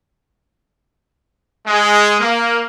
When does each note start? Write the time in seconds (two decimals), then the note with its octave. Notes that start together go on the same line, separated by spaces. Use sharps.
1.67 G#3
2.20 A#3